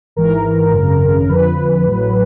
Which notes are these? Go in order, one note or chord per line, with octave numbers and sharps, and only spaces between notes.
G#1 G#2 E3 A#4
G#1 F#2 C#3
F2 D3 F3 B4
A1 A2 F#3